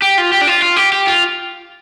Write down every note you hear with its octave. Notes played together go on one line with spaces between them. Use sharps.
G4
F4
G4
D4
F4
F4
G4
G4
F4